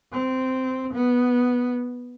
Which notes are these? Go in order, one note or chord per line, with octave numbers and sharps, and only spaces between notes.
C4
B3